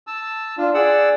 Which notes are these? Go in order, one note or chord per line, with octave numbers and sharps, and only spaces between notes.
A5 E6
D4 F4
G#4 D5 F#5 E6